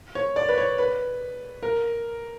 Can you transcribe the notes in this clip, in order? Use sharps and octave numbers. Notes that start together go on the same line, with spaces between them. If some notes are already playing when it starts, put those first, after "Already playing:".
C#5
D5
B4
C#5
B4
A#4